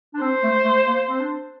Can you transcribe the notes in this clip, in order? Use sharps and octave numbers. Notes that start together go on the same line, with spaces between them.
D4
C4 C5
A3
A3
A#3
C4
D4